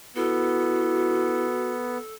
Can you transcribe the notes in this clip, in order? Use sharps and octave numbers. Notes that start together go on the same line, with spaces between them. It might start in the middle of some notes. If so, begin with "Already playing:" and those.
B3 E4 F#4 A4